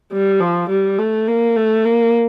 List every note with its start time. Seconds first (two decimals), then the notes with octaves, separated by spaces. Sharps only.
0.13 G3
0.41 F3
0.70 G3
0.99 A3
1.28 A#3
1.57 A3
1.85 A#3